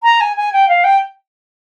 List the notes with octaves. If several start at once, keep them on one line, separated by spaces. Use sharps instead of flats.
A#5
G#5
G#5
G5
F5
G5